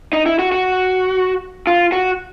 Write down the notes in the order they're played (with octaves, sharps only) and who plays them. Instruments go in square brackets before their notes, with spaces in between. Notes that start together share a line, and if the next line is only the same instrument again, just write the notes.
[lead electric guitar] D#4
E4
F#4
F#4
F4
F#4